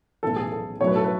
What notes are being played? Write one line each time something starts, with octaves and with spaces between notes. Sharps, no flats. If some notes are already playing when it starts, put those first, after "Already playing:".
B1 A2 E3 A4
G#4
A4
B1 A2 F#3 A3 C#5
B4
A4
B4